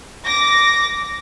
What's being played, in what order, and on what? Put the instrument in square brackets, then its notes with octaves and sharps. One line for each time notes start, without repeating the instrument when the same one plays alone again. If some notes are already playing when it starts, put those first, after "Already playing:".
[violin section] D6 A#6